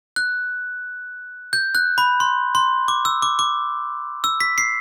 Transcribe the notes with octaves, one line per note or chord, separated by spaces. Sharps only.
F#6
G6
F#6
B5
C6
C6
D6
E6
D6
D6
E6
B6
C7